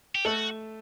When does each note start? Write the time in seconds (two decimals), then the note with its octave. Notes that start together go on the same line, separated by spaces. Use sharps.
0.15 G4
0.25 A3 F#4 A4